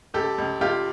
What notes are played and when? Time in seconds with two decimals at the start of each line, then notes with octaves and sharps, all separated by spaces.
0.14 C#2 G4 A4
0.38 C#2
0.61 C#2 F4 G4